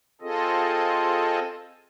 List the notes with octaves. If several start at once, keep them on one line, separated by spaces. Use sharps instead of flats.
C4 F4 G#4 A4 D#5